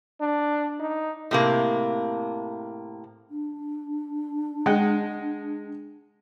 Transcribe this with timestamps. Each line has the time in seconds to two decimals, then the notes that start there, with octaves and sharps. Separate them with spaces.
0.21 D4
0.80 D#4
1.31 A2 C3 A#3
3.30 D4
4.66 G#3 F#5 G5